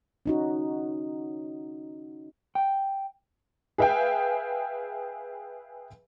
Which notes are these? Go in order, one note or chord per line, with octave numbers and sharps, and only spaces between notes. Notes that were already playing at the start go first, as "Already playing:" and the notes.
C#4 D#4 F#4
G5
G#4 B4 E5 F5 G5 G#5